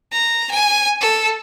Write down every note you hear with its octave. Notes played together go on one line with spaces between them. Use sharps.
A#5
G#5
A4